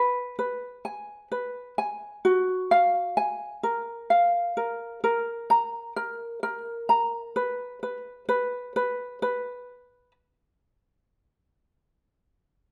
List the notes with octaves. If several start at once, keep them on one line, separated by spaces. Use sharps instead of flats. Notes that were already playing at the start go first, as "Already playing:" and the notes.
Already playing: B4
B4
G#5
B4
G#5
F#4
F5
G#5
A#4
F5
A#4
A#4
A#5
A#4
A#4
A#5
B4
B4
B4
B4
B4